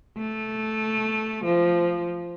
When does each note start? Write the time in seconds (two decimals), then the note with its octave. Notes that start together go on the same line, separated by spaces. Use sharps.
0.18 A3
1.45 F3